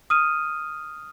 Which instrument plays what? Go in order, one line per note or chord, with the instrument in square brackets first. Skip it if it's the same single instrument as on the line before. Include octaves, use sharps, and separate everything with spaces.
[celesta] D#6 F6 D#7